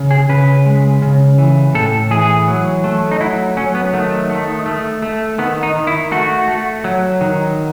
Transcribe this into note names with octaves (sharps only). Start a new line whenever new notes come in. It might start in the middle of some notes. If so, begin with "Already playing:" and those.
Already playing: C#3
G#4
C#3 B4
G#3
C#3
E3
A2 A4
E3 G#4
F#3
A3
D#4
F#3 E4
F#3 C#4
B3
D#3 A3
A3
A3
A3
D#3 B3
D#4
D#3
E4
A3 F#4
A3
F#3
D#3